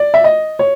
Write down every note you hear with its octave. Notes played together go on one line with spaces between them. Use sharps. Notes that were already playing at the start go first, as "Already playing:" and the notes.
Already playing: D5
E5
D#5
C#5